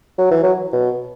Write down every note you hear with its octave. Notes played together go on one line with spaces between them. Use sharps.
F#3
E3
F#3
B2